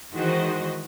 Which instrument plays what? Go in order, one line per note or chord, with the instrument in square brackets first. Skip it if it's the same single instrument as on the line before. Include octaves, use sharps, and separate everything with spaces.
[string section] D#3 E3 G#3 F#4 C5 D#5